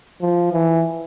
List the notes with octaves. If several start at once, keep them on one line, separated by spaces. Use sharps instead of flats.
F3
E3